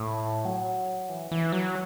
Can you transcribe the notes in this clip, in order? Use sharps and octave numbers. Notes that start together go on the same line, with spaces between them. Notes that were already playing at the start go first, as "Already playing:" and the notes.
Already playing: A2
F#3
E3
E3
F#3